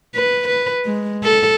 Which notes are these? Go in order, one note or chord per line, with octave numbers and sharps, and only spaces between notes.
B4
B4
G#3
A4